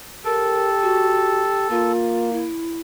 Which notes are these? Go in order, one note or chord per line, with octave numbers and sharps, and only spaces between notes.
G4 A4 A#4
F#4
A#3 F4
E4